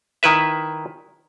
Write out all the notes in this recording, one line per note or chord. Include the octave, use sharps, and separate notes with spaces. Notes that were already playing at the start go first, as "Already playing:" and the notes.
D#3 E4 B4 E5